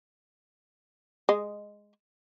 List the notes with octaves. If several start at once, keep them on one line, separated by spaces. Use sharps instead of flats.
G#3 D#5